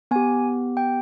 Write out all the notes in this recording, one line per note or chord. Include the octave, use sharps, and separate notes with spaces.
B3 G4 G#5
G5